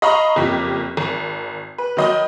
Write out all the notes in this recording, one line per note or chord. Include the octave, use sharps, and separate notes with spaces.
D#5 F5 A#5 B5 C#6
F#1 F2 G4 B6
G#1
B4
D#3 F#3 D#5 B5